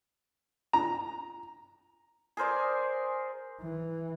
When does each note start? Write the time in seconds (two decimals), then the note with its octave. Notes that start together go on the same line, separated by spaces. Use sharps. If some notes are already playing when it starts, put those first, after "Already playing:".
0.73 A#5
2.37 G#4 A#4 C5 D5
3.61 E3